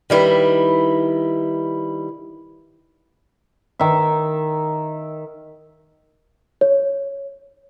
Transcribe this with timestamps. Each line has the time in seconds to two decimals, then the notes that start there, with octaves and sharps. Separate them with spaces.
0.10 D#3 G3 E4 B4
3.79 D#3 E5
6.61 C#5